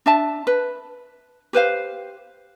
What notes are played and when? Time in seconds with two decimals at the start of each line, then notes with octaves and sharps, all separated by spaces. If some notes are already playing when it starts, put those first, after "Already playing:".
0.06 D4 E5 A5
0.47 B4
1.53 G4 B4 C5 F5